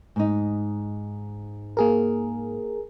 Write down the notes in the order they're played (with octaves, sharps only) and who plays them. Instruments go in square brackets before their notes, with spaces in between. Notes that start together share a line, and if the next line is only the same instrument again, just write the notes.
[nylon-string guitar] G#2 D#4
[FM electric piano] A#3 G#4 A#4